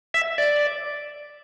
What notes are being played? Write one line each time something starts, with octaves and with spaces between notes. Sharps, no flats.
E5
D5